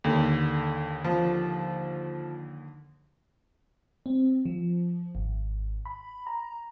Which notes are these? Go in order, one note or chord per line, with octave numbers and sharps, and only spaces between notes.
D#2 D3
F3
C4
F3
G#1
B5
A#5